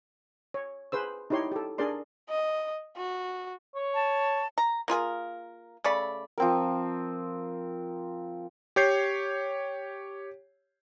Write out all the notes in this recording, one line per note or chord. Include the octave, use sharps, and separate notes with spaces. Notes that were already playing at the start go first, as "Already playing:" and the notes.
C#5
G#4 B4 C5 E6
D#4 E4 G4 C#5 C6
G4 A4
D4 G#4 A#4 D5 C6
D#5
F#4
C#5
A5
A#5
A#3 F4 G#4 A#4
C#3 A3 D5 B5
F3 C4 A#4
G4 C#5 G6 C7